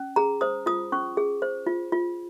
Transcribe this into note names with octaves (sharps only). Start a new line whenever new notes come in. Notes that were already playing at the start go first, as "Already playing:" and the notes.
Already playing: C#4
G#4 A#5
C5 D#6
F4 D#6
C#4 C#6
G#4
C5
F4
F4